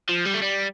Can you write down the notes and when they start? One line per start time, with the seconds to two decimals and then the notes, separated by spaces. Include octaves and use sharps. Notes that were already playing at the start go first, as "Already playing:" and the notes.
0.09 F3
0.25 G3
0.34 A3
0.42 G3